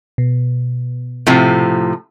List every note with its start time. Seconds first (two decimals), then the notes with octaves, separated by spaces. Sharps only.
0.18 B2
1.27 A2 C3 F3